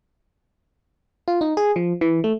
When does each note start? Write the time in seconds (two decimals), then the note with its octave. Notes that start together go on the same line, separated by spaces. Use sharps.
1.28 F4
1.41 D#4
1.57 G#4
1.76 F3
2.01 E3
2.24 A3